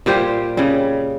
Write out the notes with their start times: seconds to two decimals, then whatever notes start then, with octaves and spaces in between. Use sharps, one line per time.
0.06 A#2 G3 G4 C5
0.57 C#3 G3